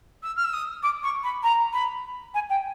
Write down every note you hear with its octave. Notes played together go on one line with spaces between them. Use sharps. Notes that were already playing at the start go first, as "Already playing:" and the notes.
E6
F6
E6
D#6
D6
C#6
B5
A#5
B5
G#5
G5